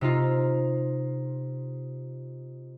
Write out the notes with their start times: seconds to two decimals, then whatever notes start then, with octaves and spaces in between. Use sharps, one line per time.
0.01 C3 D#4 F4